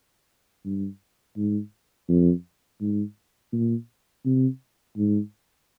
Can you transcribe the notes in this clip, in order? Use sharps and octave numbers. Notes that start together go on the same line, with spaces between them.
G2
G#2
F2
G#2
A#2
C3
G#2